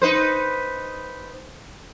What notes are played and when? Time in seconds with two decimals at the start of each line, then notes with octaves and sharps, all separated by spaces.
0.02 D#4 B4 C5